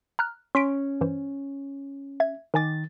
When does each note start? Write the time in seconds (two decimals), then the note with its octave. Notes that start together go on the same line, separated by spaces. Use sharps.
0.19 A#5 F6 F#6
0.55 C#4 C6 B6 D7
1.01 G2 E3 C5
2.20 E5 G#6
2.54 D#3 A#4 G#5 D6 A6